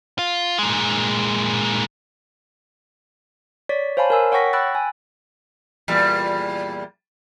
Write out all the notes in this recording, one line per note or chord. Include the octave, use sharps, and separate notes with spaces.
F4
A#2 G#3
C#5 D5 B6
C5 C#5 F5 G#5 A5 B5
A#4 G#5 E6
C#5 F#5 G5 C#6 A#6 B6
G5 B5 E6 F#6 A6
G#5
E2 A#2 G3